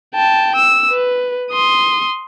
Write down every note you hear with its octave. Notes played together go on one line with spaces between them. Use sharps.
G5 A5
E6
B4
C6 D#6